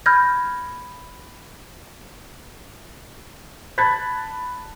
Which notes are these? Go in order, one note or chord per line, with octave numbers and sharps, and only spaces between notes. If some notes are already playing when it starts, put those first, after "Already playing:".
B5 F6 G6 G#6 A#6
A5 B5 F#6 G#6 A6 B6